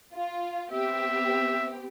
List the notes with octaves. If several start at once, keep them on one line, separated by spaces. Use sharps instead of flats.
F4
B3 C4 G4 E5